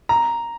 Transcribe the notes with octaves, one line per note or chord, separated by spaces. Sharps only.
A#5